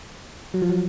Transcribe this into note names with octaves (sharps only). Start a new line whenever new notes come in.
F#3
F3
F#3